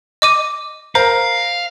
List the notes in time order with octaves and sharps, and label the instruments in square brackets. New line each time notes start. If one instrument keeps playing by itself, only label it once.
[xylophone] D#5 D6 D#7
[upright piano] A#4 [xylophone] C5 [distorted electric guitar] F5